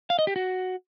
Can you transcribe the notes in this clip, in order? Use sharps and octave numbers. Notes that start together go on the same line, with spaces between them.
F5
D#5
G4
F#4